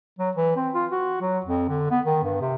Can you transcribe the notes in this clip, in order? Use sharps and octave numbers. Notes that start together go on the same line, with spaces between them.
F#3
E3
C4
F4
F#4
F#3
F2
D3
B3
D#3
G2
C3